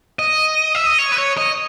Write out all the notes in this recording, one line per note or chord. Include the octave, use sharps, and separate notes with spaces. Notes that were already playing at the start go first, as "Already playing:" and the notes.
D#5
E5
D#5
C#5
B4
C#5
D#5